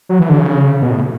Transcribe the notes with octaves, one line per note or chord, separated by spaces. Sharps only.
F#3
E3
D3
C#3
B2
A2